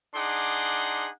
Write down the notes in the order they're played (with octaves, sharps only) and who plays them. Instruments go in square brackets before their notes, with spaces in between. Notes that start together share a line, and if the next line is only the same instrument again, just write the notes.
[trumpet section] D4 D#4 G#4 F#5 C6 D6